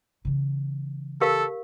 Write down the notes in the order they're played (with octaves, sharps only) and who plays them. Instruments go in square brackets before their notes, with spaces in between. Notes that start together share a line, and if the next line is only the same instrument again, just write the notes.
[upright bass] C#3 E3
[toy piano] G4 A#4 F5 [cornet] A4